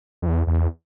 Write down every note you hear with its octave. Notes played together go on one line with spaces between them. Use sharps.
F2
E2
E2